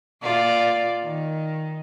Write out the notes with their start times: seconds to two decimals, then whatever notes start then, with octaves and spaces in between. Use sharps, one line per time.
0.23 A#2 F4 D5
1.04 D#3